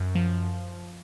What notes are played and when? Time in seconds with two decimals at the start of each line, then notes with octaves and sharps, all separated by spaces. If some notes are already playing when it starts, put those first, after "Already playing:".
Already playing: F#2
0.15 F3